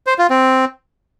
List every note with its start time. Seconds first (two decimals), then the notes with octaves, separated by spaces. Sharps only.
0.07 C5
0.18 F4
0.30 C4